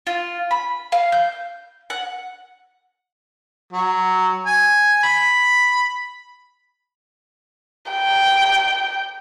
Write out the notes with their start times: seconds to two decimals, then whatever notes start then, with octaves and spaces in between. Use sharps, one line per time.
0.07 F4
0.51 B5
0.92 F5
1.12 G6
1.90 F#5
3.73 F#3
4.46 G#5
5.03 B5
7.92 G5